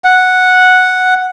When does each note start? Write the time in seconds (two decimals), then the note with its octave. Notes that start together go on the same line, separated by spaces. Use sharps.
0.04 F#5